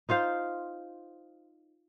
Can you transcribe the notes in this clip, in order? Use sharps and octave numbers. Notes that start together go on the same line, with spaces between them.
D#4 F4 C5 F5